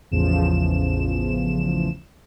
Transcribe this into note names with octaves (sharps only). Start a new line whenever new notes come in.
A1 E2 C#3 F3 E7